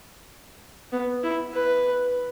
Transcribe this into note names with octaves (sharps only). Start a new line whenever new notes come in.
B3
E4
B4